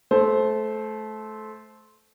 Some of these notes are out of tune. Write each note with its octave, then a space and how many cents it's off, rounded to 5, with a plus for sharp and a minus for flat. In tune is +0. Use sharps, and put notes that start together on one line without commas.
A3 -20 C5 +0